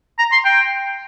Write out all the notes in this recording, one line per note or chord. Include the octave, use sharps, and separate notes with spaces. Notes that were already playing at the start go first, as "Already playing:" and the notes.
A#5
C6
G5